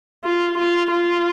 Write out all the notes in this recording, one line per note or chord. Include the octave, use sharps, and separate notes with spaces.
F4
F4
F4